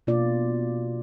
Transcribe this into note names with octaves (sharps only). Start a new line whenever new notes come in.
B2 A#3 F4 D5